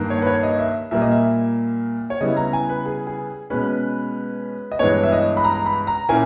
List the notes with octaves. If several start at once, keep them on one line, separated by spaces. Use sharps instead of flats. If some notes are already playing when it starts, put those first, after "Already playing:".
Already playing: G2 D#3 A#3
C#5
B4
C#5
D#5
E5
A#2 G3 A#3 E5
D#5
E5
C#5
C#3 G3 B3 E4 D#5
A#5
G#5
B4
G#4
G#4
B2 G#3 C#4 B4
D#5
G2 E3 G#3 B3 C#5
E5
D#5
B5
A#5
B5
A#5
A#2 A#3 C#4 E4 G#5